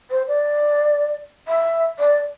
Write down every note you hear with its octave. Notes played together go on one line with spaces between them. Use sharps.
C5
D5
E5
D5